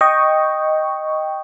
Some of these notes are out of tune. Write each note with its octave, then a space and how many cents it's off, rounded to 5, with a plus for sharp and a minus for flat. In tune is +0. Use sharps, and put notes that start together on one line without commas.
D#5 +0 G5 +0 C#6 +0